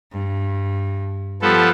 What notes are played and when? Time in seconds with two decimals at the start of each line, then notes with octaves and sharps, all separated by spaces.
0.12 G2
1.42 F3 G3 B3 A4